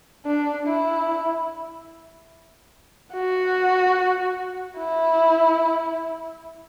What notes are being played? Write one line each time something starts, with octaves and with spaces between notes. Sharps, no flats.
D4
E4
F#4
E4